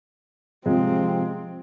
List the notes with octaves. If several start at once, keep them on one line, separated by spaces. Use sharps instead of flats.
C3 F3 G#3 C4